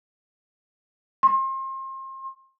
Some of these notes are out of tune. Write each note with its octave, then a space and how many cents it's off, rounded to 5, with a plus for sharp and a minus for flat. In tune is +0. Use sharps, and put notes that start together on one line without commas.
C6 +35